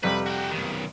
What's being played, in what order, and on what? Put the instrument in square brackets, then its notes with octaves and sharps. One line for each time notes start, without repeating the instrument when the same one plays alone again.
[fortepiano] F2 C3 G3 [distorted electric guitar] B4
[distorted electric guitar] F#4 G5
B1 D#3